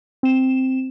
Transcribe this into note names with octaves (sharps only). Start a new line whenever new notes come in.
C4 E7